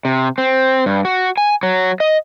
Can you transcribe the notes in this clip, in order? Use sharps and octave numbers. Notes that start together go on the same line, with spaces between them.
C3
C4
G2
F#4
G#5
F#3
D#5